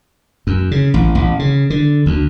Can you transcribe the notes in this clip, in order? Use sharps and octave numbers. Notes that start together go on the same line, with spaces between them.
F#2
C#3
A1
A1
C#3
D3
D2